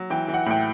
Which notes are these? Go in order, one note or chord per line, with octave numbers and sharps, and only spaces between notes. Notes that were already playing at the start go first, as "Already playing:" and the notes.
Already playing: F#3
E3 G5
E3
F#5
A2 G5